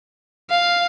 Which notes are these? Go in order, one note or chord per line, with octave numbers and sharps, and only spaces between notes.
F5